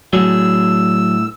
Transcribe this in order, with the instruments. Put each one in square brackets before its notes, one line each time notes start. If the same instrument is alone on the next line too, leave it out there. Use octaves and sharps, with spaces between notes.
[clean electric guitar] A2 D4 G#4 [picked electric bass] F#3 [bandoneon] E6